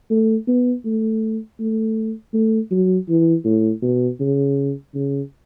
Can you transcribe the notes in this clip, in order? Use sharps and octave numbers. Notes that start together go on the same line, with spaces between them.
A3
B3
A3
A3
A3
F#3
E3
A2
B2
C#3
C#3